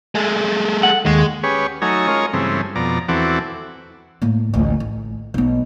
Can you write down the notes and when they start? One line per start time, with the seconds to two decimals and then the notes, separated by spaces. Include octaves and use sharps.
0.15 G#3 A3
0.83 F#5
1.06 D#2 G#3
1.43 C#4 G4 G#4 B4 C#5
1.82 F#3 A3 D#4 C#5 G#5 A#5
2.07 G#3 C#4 F4 A#4 C#5 D#5
2.33 G2 C#3 E3 G#3 A3 C4
2.75 F2 B2 D5 A#5
3.08 E2 E3 C4 F#4 A4 D6
4.22 A2 A#3
4.54 A1 D2
4.80 A1
5.34 B1 B3